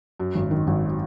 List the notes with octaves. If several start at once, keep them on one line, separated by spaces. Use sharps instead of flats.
F#2
G#1
D#3
G#1